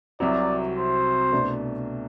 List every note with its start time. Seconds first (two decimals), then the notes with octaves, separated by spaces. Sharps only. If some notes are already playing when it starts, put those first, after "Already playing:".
0.20 C2 C3 F#3 D5
0.77 C5
1.32 C2 B2 A3 D4